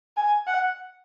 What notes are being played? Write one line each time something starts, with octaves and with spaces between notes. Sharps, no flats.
G#5
F#5